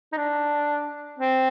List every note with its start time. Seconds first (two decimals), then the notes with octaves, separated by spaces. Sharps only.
0.13 D#4
0.17 D4
1.19 C4